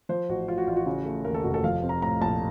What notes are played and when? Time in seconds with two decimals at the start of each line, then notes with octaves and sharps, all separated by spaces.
0.09 F3 C5
0.29 A1 F#4
0.48 A2 F4
0.58 F#4
0.67 A1 F4
0.76 F#4
0.86 C#3
1.06 A3
1.25 D#2 A#4
1.34 A4
1.44 F1 F#4
1.54 A4
1.64 F3 F5
1.83 C4
1.89 A#5
2.02 A2 A#5
2.20 A#1 A5